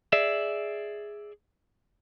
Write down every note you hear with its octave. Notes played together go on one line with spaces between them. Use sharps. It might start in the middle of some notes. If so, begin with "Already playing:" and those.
G#4 D5 E5